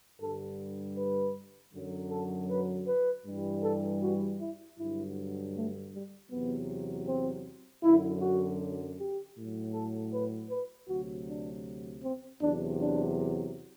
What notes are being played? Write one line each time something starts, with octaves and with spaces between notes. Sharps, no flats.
G2 D3 G3 A4
B4
F#2 D3 F#3
A4
B4
B4
G2 E3 G3
A4
F#4
E4
G2 D3 F#3 E4
A3
G3
E2 C3 F#3 B3
C4
F#2 D3 F#3 E4
F#4
G4
A2 F#3
A4
B4
B4
D2 C3 F#3 F#4
D4
C4
E2 C3 F#3 D4
D4